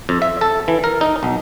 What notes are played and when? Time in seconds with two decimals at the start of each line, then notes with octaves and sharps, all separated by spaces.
0.09 F2
0.22 E5
0.41 A4
0.68 E3
0.84 A#4
1.01 D#4
1.23 B1